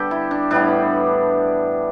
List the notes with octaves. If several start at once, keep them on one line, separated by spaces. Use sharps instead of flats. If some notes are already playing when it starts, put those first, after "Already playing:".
Already playing: D3 G3 B3 G4 A4
E4
D4
A2 E3 G3 B3 D4